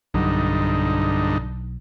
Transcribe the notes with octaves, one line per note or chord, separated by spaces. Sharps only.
B1 G2 D3 F#3 D#4